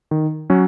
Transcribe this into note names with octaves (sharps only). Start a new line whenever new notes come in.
D#3
F#3 C#4 F#4